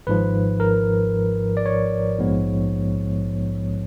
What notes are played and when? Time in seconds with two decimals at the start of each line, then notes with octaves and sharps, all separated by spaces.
0.07 G#1 G#2 F3 B4
0.60 A#4
1.57 D5
1.66 C#5
2.18 A#1 G#2 F3 G#3 B3